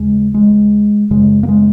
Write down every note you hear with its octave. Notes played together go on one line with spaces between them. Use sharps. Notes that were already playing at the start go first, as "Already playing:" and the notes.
Already playing: D#2 C#3 G#3
G#3
F#2 C#3 G#3
A#3
G#3